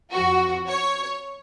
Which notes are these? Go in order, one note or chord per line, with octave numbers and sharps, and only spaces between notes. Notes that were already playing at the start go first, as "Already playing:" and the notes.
F2 F3 F#4
C#5